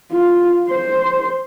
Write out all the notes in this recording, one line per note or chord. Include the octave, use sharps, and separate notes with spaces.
F4
C5